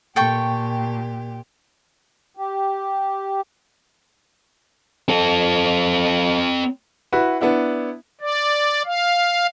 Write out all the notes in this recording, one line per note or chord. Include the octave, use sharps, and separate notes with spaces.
A#2 G4 A4 G5 C#6
G4
C4 A4
E4 F#4 B4
B3 D4 E4 F#5
D5
F5